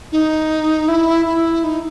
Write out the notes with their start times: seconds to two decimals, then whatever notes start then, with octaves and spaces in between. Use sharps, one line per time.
0.12 D#4
0.88 E4
1.26 E4
1.64 D#4